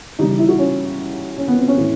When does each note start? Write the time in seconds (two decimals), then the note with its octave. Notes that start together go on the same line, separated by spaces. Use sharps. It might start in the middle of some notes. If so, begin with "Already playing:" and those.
0.19 C#3 E3 G3 D#4
0.29 D#4
0.39 E4
0.49 F#4
0.59 C#4
1.38 C#4
1.48 B3
1.58 C4
1.68 C#4
1.78 A2 E3